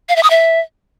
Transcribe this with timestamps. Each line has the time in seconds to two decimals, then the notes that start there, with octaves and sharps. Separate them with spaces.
0.09 F5
0.16 E5
0.23 D#6
0.30 E5